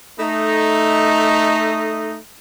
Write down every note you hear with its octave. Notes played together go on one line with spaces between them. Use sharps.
A3 D#4